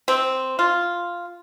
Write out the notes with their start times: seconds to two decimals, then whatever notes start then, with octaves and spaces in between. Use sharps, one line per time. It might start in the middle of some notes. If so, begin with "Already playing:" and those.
0.08 C4
0.59 F4